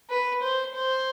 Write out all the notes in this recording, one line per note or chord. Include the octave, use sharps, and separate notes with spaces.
B4
C5
C5